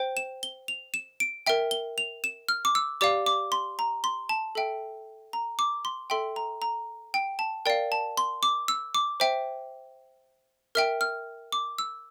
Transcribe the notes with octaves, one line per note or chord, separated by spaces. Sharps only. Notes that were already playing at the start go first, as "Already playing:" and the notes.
Already playing: C5 G5
E7
G7
F7
E7
D7
A#4 E5 G5
G7
F7
E7
F6
D6
E6
G4 D5 F5 D6
D6
C6
A#5
C6
A5
A4 E5 G5
A#5
D6
C6
A4 E5 G5 C6
A#5
A#5
G5
A5
A#4 D5 F5 G5
A5
C6
D6
E6
D6
C5 E5 G5
A#4 E5 G5 F6
F6
D6
E6